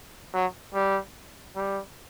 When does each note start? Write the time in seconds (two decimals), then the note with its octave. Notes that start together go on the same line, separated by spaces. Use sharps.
0.34 F#3
0.74 G3
1.56 G3